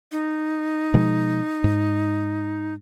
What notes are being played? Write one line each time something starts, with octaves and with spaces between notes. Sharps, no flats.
D#4
B2 F3 G#3
G#2